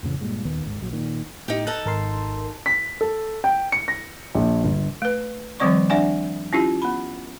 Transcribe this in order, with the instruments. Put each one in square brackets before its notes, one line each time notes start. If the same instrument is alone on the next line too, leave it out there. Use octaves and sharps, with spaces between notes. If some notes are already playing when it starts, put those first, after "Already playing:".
[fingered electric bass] F2 A2 C#3 E3
G2 A#2 G#3
D#1 D#2 D#3 B3
D1 G1 G#2
A#1 F#3
A#2 D#3
[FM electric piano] A2 [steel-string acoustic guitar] D#4 G4
[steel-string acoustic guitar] D#4 A4 A5 [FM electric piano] F#6
[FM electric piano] G#1 A#4 C6
[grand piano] B6
A4
G5
C#7
A#6
A#1
G1
[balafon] A3 B4
D#3 F3 G3 C4 D5 C#6
D4 D5 E5 F#5 G#5
C#4 E4 F4 G4
B3 B5